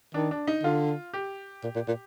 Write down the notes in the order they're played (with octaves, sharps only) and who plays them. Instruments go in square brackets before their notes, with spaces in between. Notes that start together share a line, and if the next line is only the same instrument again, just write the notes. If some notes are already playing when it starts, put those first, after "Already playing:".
[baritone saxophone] D#3 [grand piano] D4
[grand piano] D4
D#4
[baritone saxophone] D3 [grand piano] F4
[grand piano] G4
[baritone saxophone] A#2
A#2
A#2